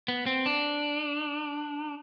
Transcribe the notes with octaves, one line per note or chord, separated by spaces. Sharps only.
B3
C4
D4